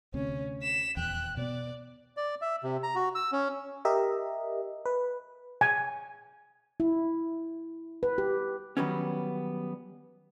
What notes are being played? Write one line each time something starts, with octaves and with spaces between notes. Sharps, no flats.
D2 C3 C#4
B6 E7
D#1 E2 G5 F#6
B2 B3 D5
D5
E5
C3
A#5
F#4
E6
C#4
G4 A#4 D#5 E5
B4
G#5
E4
B4
G4
D#3 F#3 G3 B3 C#4